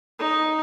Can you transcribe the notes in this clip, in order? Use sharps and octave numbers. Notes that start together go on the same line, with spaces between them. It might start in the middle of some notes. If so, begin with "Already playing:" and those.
D#4